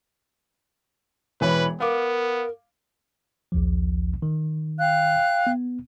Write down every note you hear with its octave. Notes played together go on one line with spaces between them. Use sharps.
E1 E3 B4 C#5 B5
B3 A#4 F5 D6
A#1 D#2 F3
D#3
F5 G5 F#6
B3